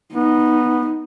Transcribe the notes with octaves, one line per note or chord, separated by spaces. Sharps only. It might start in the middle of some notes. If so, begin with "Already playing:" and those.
B3 D#4